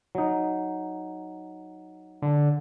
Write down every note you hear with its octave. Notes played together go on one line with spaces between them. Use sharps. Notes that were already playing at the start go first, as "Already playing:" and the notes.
F#3 D#4
D3